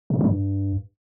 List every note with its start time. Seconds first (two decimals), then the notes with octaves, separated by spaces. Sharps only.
0.10 B2
0.15 A2
0.21 F#3
0.26 G2